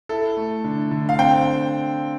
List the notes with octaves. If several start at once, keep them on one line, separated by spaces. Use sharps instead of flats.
E4 A4
A3
D3
D3
F5
C4 G5